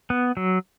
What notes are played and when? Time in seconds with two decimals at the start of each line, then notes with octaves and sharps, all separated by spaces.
0.10 B3
0.37 F#3